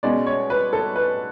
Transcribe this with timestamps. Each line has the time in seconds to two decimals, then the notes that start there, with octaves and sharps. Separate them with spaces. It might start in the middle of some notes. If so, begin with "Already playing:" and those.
0.03 B2 G#3 C#4 D5
0.27 C#5
0.50 B4
0.73 A4
0.96 B4